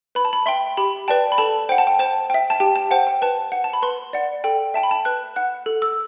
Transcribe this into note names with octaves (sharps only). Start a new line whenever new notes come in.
B4 B5
A5
B5
E5 G5 C6
G4 B5
B4 D5 G5 A5
B5
A4 A5
C5 F#5 G5
A5
G5
C5 A5
E5 G5
A5
G4 G5
A5
C5 F#5 G5
G5
B4 A5
F#5
A5
B5
B4 C6
D5 F#5
A4 G5
E5 G5 A5
B5
A5
B4 F#6
F#5 F#6
A4
E6